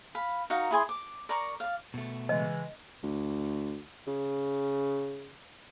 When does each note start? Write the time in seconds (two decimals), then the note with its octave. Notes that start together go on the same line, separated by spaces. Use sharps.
0.15 F5 B5
0.50 D#4 F#4 A#4 F5
0.71 E4 G#4 G#5 C6
0.89 D6
1.29 A#4 D5 A#5 C#6
1.60 D5 F5
1.94 B2 A3
2.29 C#3 E3 G#3 D#5
3.03 D2
4.07 C#3